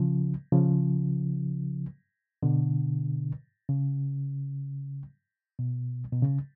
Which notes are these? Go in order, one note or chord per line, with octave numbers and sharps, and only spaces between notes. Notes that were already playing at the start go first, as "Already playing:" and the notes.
Already playing: C#3 F3
C#3 F3
B2 D3
C#3
B2
B2
C#3